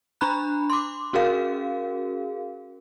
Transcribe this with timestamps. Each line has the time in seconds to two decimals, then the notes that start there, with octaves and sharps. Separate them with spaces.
0.21 D4 A#5 B5 F#6
0.70 C6 D6
1.13 C#4 F#4 G#4 A#4 F5